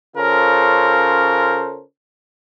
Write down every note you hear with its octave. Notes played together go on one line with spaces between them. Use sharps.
C#3 C#4 F4 A4 A#4 C5